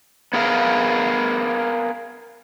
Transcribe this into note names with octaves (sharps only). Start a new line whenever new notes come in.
B3 G#4 A#4 F5